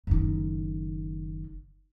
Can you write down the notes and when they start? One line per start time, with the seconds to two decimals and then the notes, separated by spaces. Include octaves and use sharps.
0.07 F#1 D#3